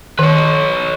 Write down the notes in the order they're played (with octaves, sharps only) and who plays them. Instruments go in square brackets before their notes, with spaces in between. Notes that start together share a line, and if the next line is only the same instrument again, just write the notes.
[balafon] D#3 [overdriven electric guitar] B4 C#5